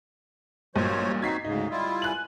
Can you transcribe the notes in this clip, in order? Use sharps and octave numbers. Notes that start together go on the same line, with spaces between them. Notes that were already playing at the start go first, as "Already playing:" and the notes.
A1 G2 A#2 F#3 C5 C#5
C4 D#4 F#4 G#6 B6 C7
D2 G#2 C#3 D#4
G3 E4 F4
G#5 F#6 F#7